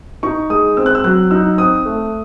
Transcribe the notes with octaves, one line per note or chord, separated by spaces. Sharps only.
D#4 C#6
G#3 D#6
C4 E6
F#6
E6
F#3 F#6
D#4 E6
C4 D#6
A3